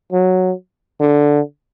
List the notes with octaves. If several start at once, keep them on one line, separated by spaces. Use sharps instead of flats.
F#3
D3